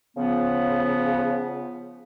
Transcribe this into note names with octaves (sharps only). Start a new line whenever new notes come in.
C#3 F3 B3